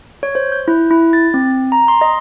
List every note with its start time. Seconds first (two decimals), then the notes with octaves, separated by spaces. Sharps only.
0.23 C#5
0.35 C5
0.52 G6
0.68 E4
0.91 E4
1.13 A6
1.34 C4
1.72 A#5
1.88 C6
2.01 D#5